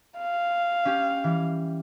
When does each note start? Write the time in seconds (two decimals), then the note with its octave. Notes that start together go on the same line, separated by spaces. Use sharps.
0.18 F5
0.85 C#4 G4
1.24 E3 G3